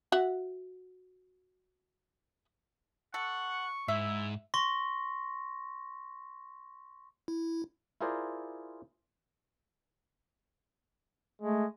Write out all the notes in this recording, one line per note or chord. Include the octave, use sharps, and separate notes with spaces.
F#4 E5 F#5
A4 F#5 C#6
G#2 E4 E5
C6 C#6 A#6
E4
E4 F4 G#4 A#4 C5 D5
G#3 A3